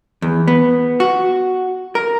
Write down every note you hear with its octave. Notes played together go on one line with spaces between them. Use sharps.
E2
B3
F#4
A#4